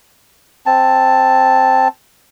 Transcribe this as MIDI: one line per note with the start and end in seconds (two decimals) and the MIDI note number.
0.66 1.88 60
0.66 1.88 81